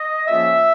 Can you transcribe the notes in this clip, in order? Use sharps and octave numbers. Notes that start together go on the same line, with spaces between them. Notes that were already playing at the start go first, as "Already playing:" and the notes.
Already playing: D#5
C#3 F3 A#3 C#4 F4 E5